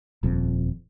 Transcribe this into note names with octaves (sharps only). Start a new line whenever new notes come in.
D#1 F2